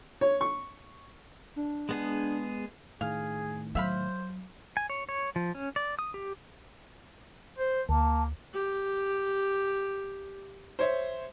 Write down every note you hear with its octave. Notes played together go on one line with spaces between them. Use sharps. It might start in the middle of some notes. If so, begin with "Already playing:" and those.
C#5
C#6
D4
G#3 B3 G#4
A2 D#3 G#4 F5
F#3 C5 E5 F5 B5
G#5
C#5
C#5
F3
C#4
D5
D#6
G4
C5
D2 A#3 A5
G4
C5 C#5 E5